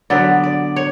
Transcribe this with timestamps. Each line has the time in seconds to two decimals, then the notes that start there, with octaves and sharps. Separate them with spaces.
0.10 D3 F#3 B3 D5
0.44 D5
0.76 C#5